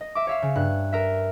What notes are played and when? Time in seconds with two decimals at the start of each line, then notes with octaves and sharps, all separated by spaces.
0.01 D#5
0.15 E5 D6
0.27 C#5 E5 F5
0.42 C#3
0.55 G2 F#6
0.92 A#4 E5